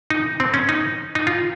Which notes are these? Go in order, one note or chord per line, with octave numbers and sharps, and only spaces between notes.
D#4
C4
C#4
D#4
D#4
F4